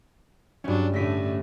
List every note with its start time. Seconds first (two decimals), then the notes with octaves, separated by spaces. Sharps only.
0.64 G2 F#3 C#4 D4
0.94 A2 D3 A3 A#6 B6 D#7